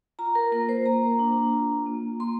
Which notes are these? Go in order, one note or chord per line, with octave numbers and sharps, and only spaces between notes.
F4 A#5
A#4
A#3 A#4
C5
A#3 A#5
D4
F4
A#3
A#3 C6